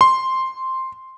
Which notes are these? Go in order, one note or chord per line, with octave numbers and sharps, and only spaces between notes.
C6